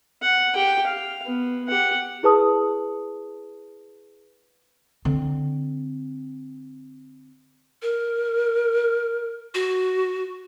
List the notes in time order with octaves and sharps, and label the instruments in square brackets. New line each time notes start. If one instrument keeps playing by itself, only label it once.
[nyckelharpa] F#5
G4 G5
F5
B3
G4 F#5
[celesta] E4 G#4 B4 A5 D#6
[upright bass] D3 C4
[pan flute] A#4
F#4